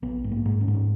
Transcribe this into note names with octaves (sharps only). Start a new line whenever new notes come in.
A#1 B3
G#2
A#3
G#2
C#4
G#2
C#4